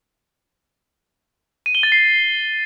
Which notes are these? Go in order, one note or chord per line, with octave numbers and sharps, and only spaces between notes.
D#7
G7
A6
C7